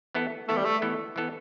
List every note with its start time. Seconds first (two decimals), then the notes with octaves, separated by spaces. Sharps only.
0.14 E3 B3 E4 A4
0.48 E3 A3 B3 E4 A4
0.56 G3
0.65 A3
0.82 E3 B3 E4 A4
1.16 E3 B3 E4 A4